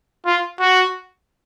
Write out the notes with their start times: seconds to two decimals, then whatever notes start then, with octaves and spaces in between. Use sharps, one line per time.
0.26 F4
0.60 F#4